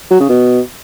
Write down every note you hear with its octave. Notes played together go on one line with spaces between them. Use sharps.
F#3
C#3
B2